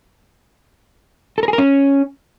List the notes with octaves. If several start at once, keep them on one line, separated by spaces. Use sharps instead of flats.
A4
A#4
G#4
A#4
C#4